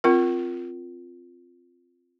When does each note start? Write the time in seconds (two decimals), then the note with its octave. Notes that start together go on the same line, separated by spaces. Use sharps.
0.04 C4 F4 A#4